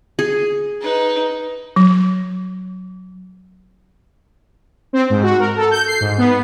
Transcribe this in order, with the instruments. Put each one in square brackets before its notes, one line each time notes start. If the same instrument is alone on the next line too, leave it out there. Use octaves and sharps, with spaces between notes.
[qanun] G#4
[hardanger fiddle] D#4 B4
[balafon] F#3
[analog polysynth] C4
G#2
F#4
A#4
A4
G6
C7
G#2
B3